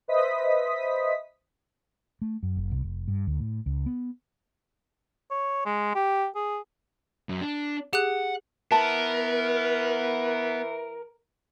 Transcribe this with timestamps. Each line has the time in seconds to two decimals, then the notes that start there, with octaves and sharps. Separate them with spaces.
0.08 B4 C5 D#5 E5 D#6 B6
2.22 A3
2.43 F#2
2.57 F#1
2.72 C2
2.83 F1
3.08 G2
3.27 D2
3.40 A2
3.66 C#2
3.86 B3
5.31 C#5
5.65 G#3
5.95 G4
6.35 G#4
7.29 F#2
7.41 D4
7.93 G4 G#4 F#5 F#6
8.72 E3 B3 A#4 A5 B5